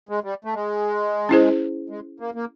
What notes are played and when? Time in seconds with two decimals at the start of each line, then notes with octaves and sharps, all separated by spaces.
0.09 G#3
0.24 G3
0.45 A3
0.54 G#3
1.29 C#4 E4 G#4 C5
1.90 G#3
2.20 A#3
2.35 A#3